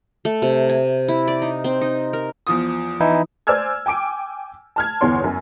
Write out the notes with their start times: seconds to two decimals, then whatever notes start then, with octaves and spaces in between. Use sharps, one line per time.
0.25 A3
0.42 C3
0.69 G#5
1.08 E4
1.28 D5
1.42 D#4
1.64 C4
1.81 D#4
2.13 A#4
2.47 E2 F3 D#6
3.00 E3 D#4 E4
3.47 C5 D5 G#5 E6 F6 G#6
3.86 G5 G#5 D6 D7
4.76 A5 F6 G#6
5.01 G1 E2 C#5 C6
5.24 F#2